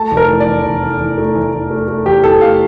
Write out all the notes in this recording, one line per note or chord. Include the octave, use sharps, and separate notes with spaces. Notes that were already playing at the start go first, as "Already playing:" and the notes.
Already playing: A3 A5
F1
A#4
E3
D5
E2
F1
E3
E3
A3
E3
E3
A3
A3
E2 G4
E3 A4
A3 F5